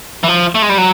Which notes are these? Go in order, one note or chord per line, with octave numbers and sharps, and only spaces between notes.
E3
F3
A3
G#3
G3
F#3